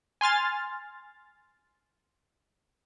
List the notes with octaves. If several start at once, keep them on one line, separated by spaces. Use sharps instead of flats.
G#5 C6 F6 A6